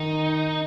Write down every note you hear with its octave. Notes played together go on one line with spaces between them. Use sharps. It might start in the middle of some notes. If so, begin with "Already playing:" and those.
Already playing: D#3 D#4